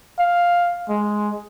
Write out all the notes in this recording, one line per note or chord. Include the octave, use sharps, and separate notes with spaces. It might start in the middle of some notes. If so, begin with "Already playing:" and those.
F5
G#3